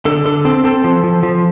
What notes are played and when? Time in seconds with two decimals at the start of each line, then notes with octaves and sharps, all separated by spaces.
0.05 D3 A4
0.25 D3 A4
0.45 C4 A4
0.64 C4 A4
0.84 F3
1.04 F3
1.23 F3